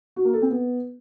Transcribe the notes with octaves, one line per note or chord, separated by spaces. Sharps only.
F#4
A#3
A4
C4
B3